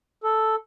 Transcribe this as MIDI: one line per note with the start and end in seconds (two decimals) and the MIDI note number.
0.24 0.55 69